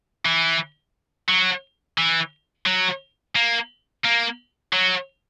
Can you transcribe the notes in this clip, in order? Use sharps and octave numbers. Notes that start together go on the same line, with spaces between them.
E3
F#3
E3
F#3
A#3
A#3
F#3